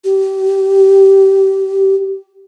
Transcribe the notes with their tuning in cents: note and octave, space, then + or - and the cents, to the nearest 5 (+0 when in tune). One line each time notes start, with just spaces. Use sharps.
G4 -20